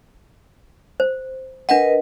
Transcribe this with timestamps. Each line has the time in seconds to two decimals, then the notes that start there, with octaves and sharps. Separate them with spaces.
1.00 C5
1.69 D4 A#4 B4 D#5 F#5